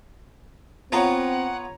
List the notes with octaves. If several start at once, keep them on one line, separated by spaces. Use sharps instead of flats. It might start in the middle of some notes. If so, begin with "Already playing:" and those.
B3 C4 F4 C#5 F#5 A#5